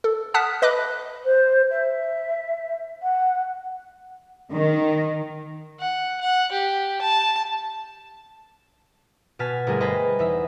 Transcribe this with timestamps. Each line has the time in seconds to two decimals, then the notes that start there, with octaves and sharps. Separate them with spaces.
0.04 A4
0.34 F#5 A5 D#6 F6 F#6 B6
0.62 B4 D#5 B5 D6 F#6
1.25 C5
1.70 E5
3.02 F#5
4.54 D#3
5.80 F#5
6.21 F#5
6.52 G4
7.02 A5
9.39 B2 G#5 A5 F6 B6
9.67 G1 A3 G#4 A#4 G#5
9.80 B4 C5 D#5 G#5 A5 B5
10.19 E2 D#4 E5